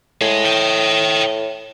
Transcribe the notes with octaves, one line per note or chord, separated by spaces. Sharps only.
A2 G#3
D#5 G5